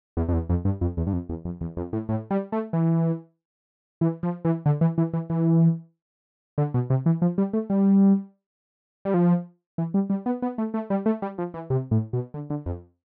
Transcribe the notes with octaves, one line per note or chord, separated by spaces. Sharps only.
E2
F2
E2
F2
G2
F2
E2
G2
F2
E2
F2
E2
F2
A2
A2
G3
A3
E3
E3
F3
E3
D3
E3
E3
E3
E3
D3
B2
C3
E3
F3
G3
A3
G3
G3
F3
E3
G3
G3
B3
B3
A3
A3
G3
A3
G3
F3
E3
C3
A2
B2
D3
D3
F2